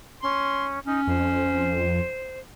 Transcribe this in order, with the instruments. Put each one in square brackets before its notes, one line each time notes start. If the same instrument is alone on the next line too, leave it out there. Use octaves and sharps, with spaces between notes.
[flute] C#4 [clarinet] C6
[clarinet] C#4 [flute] D#4
[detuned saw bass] F2 [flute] C5